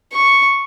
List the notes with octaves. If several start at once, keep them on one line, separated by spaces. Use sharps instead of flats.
C#6